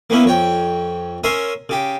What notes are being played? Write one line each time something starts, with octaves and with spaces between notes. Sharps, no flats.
A#3 B3 C#4 E4
F2 C#5 G5
C#4 A#4 E5 C6 D#6
C#3 G4